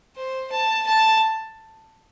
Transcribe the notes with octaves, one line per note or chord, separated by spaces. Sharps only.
C5
A5
A5